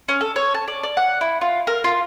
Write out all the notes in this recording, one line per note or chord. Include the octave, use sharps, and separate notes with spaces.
C#4
A4
C#5
A5
D5
D5
F#5
E4
F4
A#4
F4